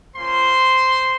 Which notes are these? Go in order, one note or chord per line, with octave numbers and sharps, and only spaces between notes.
A#3 C#4 F4 C5 C6